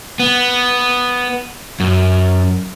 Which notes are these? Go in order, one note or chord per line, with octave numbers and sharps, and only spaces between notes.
B3
F#2